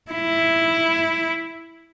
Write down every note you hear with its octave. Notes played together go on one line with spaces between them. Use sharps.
E4